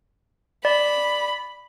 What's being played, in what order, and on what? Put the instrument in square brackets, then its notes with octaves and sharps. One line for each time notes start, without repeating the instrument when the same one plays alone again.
[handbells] D5 [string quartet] B5